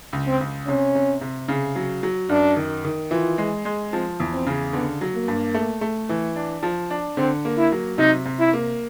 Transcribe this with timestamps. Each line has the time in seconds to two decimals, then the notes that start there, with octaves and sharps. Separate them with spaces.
0.13 C#2
0.27 C4
0.40 C#2
0.67 C3 C#4
0.95 C3
1.21 C3
1.48 C#3
1.76 F#3
2.03 F#3
2.29 F#2 D4
2.57 D#3
2.85 D#3
3.11 E3 F4
3.38 G#3
3.65 G#3
3.92 F3 C4
4.20 E2
4.33 C4
4.47 C#3
4.73 D3 B3
5.01 F#3
5.14 A#3
5.28 G2
5.54 A3
5.81 A3
6.09 E3
6.36 D4
6.63 F3
6.90 D4
7.17 D3 C4
7.45 A#3
7.57 E4
7.72 F#3
7.98 C3 D#4
8.25 C3
8.39 E4
8.53 A#3